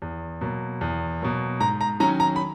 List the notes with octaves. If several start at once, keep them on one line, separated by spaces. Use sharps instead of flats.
E2
B2 F#3 A#3
E2
B2 F#3 A#3
G#2 A#5
A#5
D#3 F#3 C#4 A#5
A#5
B5